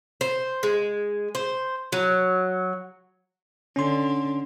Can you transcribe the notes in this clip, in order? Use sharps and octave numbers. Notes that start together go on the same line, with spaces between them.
C5
G#3
C5
F#3
D3 C#4 C6